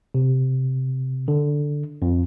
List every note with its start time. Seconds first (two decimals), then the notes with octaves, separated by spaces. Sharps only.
0.14 C3
1.28 D3
2.02 F2